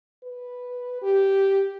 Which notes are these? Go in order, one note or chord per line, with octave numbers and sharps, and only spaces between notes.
B4
G4